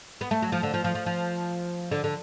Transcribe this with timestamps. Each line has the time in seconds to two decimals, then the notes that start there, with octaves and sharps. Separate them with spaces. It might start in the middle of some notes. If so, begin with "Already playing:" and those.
0.21 B3
0.31 A3
0.42 F#3
0.52 F3
0.63 D3
0.74 F3
0.84 F3
0.95 F3
1.06 F3
1.91 D3
2.04 D3